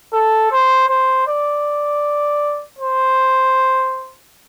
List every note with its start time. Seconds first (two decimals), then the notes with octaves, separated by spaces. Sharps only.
0.13 A4
0.52 C5
0.88 C5
1.27 D5
2.79 C5